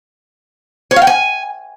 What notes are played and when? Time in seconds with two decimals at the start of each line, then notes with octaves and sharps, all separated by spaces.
0.91 C#5
0.96 F5
1.02 G5
1.07 G#5